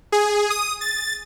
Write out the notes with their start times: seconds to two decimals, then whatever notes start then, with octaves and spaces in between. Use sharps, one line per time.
0.12 G#4
0.50 D#6
0.81 A6